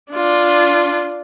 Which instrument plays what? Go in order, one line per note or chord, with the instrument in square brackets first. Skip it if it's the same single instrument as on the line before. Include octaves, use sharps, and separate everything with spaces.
[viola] D4 F4